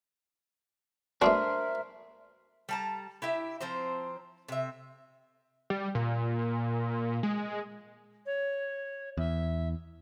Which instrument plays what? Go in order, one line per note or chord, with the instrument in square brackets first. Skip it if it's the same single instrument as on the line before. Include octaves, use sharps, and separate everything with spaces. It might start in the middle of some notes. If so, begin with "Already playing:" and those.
[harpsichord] A3 B3 F#4 [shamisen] D4 [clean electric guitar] A#4 C5 [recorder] E5
[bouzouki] G3 A5 A#5
E4 G4 E5
F3 C4 C5 A#5
C3 E5
[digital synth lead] G3
A#2
G#3
[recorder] C#5
[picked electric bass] E2 [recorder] E5